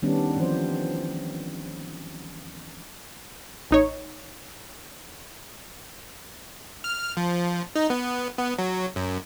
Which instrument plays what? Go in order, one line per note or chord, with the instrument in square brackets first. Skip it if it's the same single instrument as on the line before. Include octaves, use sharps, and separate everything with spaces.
[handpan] D#3 G3 B3 C#4 D4
E3 F3 C4 D4 C5
[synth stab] A1 D#4 C#5
[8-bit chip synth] F6
F3
D#4
B3
B3
F#3
F#2